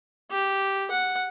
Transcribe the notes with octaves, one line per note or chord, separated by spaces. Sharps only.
G4
F#5